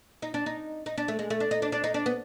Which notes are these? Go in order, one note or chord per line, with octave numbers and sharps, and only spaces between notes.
D#4
D4
D#4
D#4
D4
A3
G#3
A3
D4
D#4
D4
D4
D#4
D4
B3